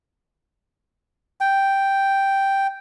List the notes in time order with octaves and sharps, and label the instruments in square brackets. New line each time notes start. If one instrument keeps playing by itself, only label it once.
[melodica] G5